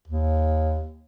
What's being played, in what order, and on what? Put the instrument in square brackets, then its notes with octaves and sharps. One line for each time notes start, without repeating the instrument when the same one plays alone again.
[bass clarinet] D#2